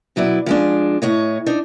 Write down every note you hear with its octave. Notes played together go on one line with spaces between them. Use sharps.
B2 F#3 E4 D5
F3 G#3 D4
A2 C#5 D#5
D4 D#4